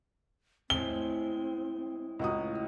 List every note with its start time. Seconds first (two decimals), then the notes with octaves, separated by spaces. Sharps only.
0.70 A2 G#3 C4 G7
2.19 C#2 A2 F#4 A#5 D#6